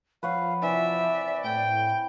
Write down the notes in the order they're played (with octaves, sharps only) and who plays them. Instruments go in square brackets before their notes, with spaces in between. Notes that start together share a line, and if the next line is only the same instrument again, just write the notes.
[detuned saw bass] F3 [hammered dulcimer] B4 C#5 F#5 [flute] F5
[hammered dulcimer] C3 E3 [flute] D5 [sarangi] E5
[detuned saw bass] A2 [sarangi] G5